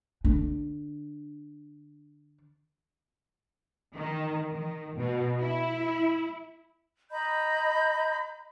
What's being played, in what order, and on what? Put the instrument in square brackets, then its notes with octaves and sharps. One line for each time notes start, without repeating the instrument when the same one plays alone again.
[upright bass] D3 D4
[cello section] D#3
D#3
B2
E4
[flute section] D#5 A#5 B5 G6